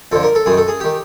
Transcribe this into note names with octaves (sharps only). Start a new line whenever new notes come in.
F2 D3 F3 A4
A#4
A4
F#2 D#3 G#4
A4
G#4
D#3 G4